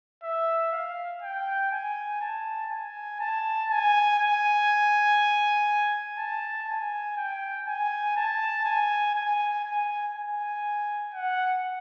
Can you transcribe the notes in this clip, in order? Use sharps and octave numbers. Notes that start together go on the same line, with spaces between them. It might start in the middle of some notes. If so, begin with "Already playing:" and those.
E5
F5
G5
G#5
A5
G#5
A5
G#5
G#5
A5
G#5
G5
G#5
A5
G#5
G#5
G#5
G#5
F#5